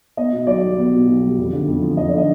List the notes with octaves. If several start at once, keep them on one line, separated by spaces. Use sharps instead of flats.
B3 D#5
B2
B1 D5
G3
B3
B2
B1
G3
F2
D3
F2
F3
F2 D#5
D5
D3 D#5